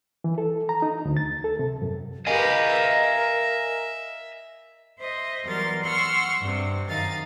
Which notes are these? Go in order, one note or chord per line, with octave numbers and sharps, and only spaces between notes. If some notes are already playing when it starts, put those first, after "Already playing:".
E3
A4
A#5
D#4
D2
A6
A4
C3
F#2
G4 A#4 B4 D#5 F5 G#5
E5
C5 D#5 E5
E2 F#3 G3 A#4 C6 A6
F#5 C6 C#6 E6 F6
G2 C3
F#2 D#3 D#4 F5 A6